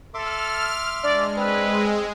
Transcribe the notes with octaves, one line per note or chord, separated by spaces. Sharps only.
A4 E5 C6 D6 F6
G#3 D4 D5
C4 B4